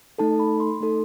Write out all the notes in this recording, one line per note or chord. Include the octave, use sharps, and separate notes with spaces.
A3 D#4 A4 A5
B5
C6
A3 D#4 A4